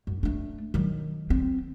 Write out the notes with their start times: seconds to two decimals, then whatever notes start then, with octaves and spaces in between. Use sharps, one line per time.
0.07 F#2
0.23 A3 D4
0.74 D#3 F#3
1.30 C4